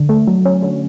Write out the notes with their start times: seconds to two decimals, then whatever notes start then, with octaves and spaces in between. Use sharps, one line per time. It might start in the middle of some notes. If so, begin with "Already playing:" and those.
Already playing: D3
0.09 A3
0.27 F#3
0.45 C#4
0.62 D3